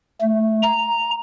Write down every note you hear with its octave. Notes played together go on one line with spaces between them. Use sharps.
A3
A#5